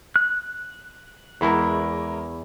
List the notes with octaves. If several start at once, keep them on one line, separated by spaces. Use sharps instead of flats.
F#6
E2 G#3 E4 A#4